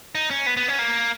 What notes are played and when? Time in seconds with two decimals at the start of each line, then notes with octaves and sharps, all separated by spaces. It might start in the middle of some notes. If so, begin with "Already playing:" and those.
0.15 D#4
0.31 C#4
0.46 B3
0.57 B3
0.68 C#4
0.79 A#3